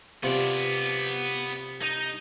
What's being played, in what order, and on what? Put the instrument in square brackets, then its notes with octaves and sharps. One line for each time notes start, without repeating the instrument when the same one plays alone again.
[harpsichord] C3 F4 [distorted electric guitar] B3 D5
[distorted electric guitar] D#4 D#5